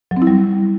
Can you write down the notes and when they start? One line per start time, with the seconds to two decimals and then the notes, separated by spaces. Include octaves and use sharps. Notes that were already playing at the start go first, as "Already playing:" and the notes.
0.11 F#3
0.17 C4
0.22 E4
0.27 G3